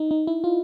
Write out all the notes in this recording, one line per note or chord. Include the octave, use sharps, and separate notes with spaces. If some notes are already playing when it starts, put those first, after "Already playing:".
Already playing: D#4
D#4
E4
F4